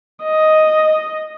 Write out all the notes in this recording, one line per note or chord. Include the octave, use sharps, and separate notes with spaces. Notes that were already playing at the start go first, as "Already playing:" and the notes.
D#5